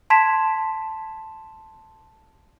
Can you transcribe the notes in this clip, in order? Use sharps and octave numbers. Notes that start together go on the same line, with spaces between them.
A5 C6 G#6 B6 E7